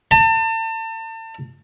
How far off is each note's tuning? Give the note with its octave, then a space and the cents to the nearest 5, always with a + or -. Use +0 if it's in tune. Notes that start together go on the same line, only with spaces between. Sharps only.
A5 +35